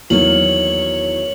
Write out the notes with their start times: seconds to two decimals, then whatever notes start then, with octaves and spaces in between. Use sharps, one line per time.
0.10 E2 D#3 F#3 A#3 C#5 F#7